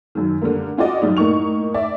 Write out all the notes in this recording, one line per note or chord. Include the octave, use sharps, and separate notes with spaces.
F#2 D#3
D3 G3 A#3
C#4 F4 F#4 D5 D#5
F#2 G3 D#4
A2 A#3 D#4 C#6 F7
D5 E5